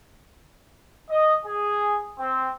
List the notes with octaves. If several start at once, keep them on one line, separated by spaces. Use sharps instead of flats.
D#5
G#4
C4